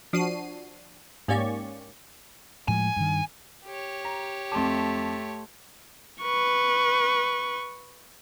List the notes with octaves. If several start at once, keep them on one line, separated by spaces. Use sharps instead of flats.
F3 D4 F#4 C7 D#7
G#2 A#3 C#4 G4 D5 C#6
A2 F3 G#3 G#5
G2 D#3
G4 C#5
A#5
F2 A3 A5 C6 D6
B4 C#6